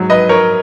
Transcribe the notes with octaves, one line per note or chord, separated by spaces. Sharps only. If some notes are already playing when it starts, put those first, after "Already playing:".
Already playing: G#2 F#3
B4 D#5
A#4 C#5